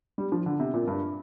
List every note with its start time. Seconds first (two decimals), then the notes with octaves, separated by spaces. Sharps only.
0.18 G3
0.32 F3
0.46 D3
0.60 C3
0.74 A#2
0.87 G2